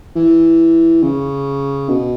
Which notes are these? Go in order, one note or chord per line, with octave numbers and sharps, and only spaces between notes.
E3
C#3
B2